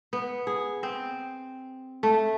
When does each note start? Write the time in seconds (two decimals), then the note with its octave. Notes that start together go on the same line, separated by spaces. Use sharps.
0.13 B3
0.47 G#4
0.83 C4
2.03 A3